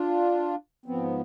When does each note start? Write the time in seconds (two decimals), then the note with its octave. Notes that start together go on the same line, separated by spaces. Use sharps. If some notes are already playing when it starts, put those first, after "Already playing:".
Already playing: D4 F4
0.86 G#2 F3 B3 C4